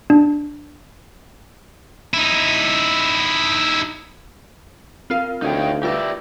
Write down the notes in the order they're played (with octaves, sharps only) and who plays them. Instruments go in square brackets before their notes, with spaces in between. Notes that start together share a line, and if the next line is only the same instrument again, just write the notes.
[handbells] D4
[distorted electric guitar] D#4 E4
[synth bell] C4 F4 A#4 [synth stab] F5
[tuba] D2 [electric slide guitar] D#4 C#5 G5
[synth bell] F4 B4 A#6 [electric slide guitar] G4 D5 E5